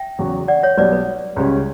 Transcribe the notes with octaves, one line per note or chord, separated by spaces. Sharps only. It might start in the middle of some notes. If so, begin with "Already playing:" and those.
Already playing: E5 G5
E2 C#3 F#3 C#4 F#4
D5 F#5
C#5 E5
B1 B2 G3 B3 B4 D5
B4
C#2 C#3 G3 C#4